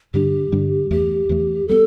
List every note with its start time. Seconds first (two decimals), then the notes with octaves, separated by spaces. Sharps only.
0.14 G2 D3 G3 D4 G4
0.52 G2 D3 G3 D4
0.91 E2 E3 A3 G4
1.29 E2 E3 A3
1.68 G3 B3 A4